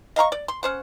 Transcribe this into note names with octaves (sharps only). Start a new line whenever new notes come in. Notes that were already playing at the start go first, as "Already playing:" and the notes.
D#5 F5 A#5 C#6
D5
C6
C#4 C5 F#5